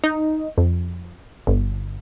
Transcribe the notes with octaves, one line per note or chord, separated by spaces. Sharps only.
D#4
F2
G1